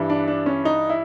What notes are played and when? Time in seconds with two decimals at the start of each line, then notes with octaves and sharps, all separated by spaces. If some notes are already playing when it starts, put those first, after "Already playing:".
Already playing: G2 E3
0.10 D4
0.28 D4
0.46 C#4
0.65 D#4
0.89 E4